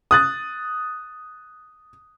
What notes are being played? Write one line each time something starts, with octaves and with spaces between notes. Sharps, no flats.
D#6 F#6 A6